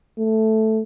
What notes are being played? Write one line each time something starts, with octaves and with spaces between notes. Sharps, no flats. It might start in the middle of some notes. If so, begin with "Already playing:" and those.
A3